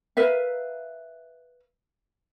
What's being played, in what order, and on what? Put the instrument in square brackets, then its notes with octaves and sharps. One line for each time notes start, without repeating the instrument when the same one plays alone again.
[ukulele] A#4 B4 E5 F5